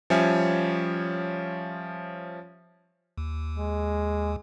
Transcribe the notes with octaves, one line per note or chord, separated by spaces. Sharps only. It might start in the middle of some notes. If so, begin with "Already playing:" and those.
F3 G3 C#4 C#5 E5 G#5
D#2
G#3